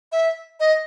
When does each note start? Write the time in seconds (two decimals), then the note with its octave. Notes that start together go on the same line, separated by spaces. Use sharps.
0.12 E5
0.60 D#5